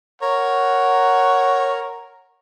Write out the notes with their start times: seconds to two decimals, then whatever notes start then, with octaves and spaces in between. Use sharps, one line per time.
0.22 A#4 C#5 F#5 A#5